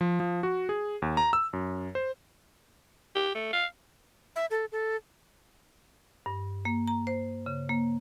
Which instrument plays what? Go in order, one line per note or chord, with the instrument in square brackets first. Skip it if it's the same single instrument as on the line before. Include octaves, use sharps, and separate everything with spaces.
[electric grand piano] F3
F3
F#4
G#4
D#2
A#5
E6
F#2
C5
[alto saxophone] G4
A3
F5
[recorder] E5
A4
A4
[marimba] G2
A#3
A#5
C5
C#3
A#3